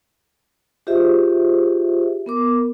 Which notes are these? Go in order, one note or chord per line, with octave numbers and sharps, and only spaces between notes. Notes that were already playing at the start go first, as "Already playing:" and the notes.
F4 G4 G#4 C5 D#5 E5
B3 A#4 D6